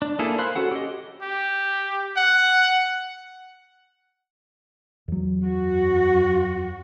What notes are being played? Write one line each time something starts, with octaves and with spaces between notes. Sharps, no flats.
D4
A#3 D4 E4 G#4 A4
A#4 C5 F5 B5 F#6
C#4 F#4 A4 F#5
G4 D#5
G4
F#5
E2 F#3
F#2 F#4